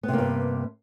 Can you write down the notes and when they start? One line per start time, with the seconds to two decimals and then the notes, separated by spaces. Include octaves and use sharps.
0.03 B3
0.08 C3
0.13 A#3
0.18 G2